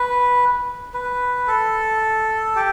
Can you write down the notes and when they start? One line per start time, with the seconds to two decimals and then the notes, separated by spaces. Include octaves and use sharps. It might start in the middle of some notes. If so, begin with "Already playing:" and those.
Already playing: B4
0.94 B4
1.47 A4
2.56 G4